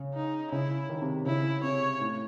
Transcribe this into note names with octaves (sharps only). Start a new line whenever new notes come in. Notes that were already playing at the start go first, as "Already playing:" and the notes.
Already playing: C#3
D#4
C#3 E4
D#3
C3
C#3 E4
C3 C#5
A2